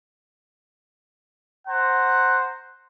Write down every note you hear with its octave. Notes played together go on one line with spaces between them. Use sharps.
C5 F#5 A#5